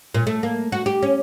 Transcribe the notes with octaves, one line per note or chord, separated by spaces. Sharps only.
A#2
A3
A#3
F#4
G4
C#4